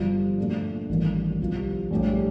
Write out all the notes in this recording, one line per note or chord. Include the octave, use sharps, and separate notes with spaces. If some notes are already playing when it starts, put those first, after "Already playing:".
Already playing: G1 G2 F3
A#2 A3 D4
A1 G2 D#3 A#3
C2 C3 F3
A#1 A2 G3 D4 G4